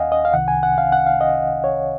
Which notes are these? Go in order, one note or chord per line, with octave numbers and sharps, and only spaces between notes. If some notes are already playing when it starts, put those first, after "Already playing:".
Already playing: D#2 D#3 D#5 F5 F#5 G#5
D#5
F5
C2 C3 D#3 F#5
G#5
F#5
F5
F#5
F5
D#5
C#5